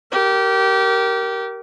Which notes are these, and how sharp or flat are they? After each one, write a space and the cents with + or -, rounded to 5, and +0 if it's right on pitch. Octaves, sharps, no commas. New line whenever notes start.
G4 -25 A#4 +0